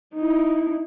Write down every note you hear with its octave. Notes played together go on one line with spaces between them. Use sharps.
D#4 E4